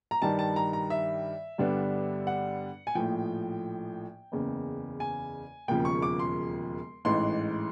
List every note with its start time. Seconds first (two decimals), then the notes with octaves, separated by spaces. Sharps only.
0.11 A#5
0.22 G2 D#3 G3 A5
0.39 A5
0.56 A#5
0.73 A#5
0.90 E5
1.58 G2 D3 G3 B3 D4
2.27 F#5
2.87 G#5
2.95 A#1 A2 F3 G5
4.32 F#1 E2 C#3
5.00 G#5
5.68 E1 D#2 C#3 F3 G5
5.85 C#6
6.02 D6
6.19 C6
7.05 A1 G#2 E3 C6